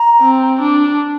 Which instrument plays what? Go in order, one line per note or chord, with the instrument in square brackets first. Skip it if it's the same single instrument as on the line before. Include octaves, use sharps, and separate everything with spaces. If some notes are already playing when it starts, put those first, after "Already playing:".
Already playing: [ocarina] A#5
[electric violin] C4
D4